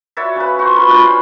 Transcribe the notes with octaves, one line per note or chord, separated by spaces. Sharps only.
F#4 C#5 D5 E5
C#3 B4
F#4 C5
F4 B4 B5 C#6
D4 F4 B4 C5
C#4 B5